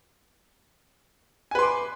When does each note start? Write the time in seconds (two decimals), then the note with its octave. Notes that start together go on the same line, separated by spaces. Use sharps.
1.51 G#5
1.55 B4
1.59 C6
1.62 D6